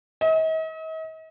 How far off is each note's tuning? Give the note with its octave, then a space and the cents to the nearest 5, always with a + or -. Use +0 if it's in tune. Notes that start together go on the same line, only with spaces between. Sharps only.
D#5 +45